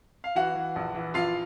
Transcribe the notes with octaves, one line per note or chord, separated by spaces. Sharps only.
F5
E3 F#4 F#5
E3
A#1
E3
A#1 F4 F5